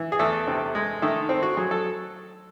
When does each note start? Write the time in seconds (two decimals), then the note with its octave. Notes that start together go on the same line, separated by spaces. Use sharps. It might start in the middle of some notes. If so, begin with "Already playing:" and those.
Already playing: E3
0.12 G#4
0.19 E2 A3 A4
0.47 C3
0.75 G#3
1.02 D#3 A3 A4
1.29 C4
1.43 F#4
1.57 F#3 G#4
1.71 A4